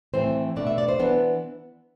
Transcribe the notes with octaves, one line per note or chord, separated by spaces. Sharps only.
A2 E3 A3 C4 C5
B2 A3 D4 D5
E5
D5
C5
E3 B3 D4